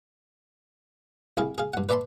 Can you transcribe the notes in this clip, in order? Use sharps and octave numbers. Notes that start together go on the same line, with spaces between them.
C2 E4 G#4 F5
G#4 F5
G2 F#5
B4 D5 E5 A5 B5 C6